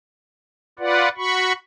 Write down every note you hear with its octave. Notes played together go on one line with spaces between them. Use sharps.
F4 B4 D5 F#5
F#4 B5 C#6